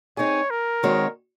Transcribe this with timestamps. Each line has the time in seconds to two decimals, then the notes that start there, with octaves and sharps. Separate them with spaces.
0.17 C4 D#4 G#4 C#5
0.50 A#4
0.83 D#3 G#3 C4 F#4 C#5